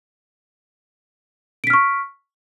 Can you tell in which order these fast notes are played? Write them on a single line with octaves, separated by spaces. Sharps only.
D7 B6 F6 C#6